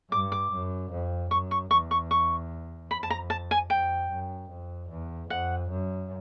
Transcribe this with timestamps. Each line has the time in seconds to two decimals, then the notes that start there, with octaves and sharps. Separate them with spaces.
0.12 G2 D6
0.32 D6
0.52 F#2
0.91 F2
1.31 F#2 C#6
1.51 C#6
1.71 E2 C#6
1.91 C#6
2.11 C#6
2.90 F2 B5
3.03 A5
3.10 A#5
3.30 A5
3.51 G#5
3.70 F2 G5
4.10 F#2
4.50 F2
4.90 E2
5.29 F2 F#5
5.70 F#2